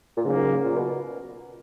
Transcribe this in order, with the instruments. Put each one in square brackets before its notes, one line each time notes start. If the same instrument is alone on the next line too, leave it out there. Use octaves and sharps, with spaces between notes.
[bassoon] A#2
[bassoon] G#2 [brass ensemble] C#3 F#3 A#3
[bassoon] A#2
B2